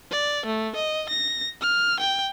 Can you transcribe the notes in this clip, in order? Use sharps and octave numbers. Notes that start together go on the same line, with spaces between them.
D5
A3
D#5
A#6
F6
G5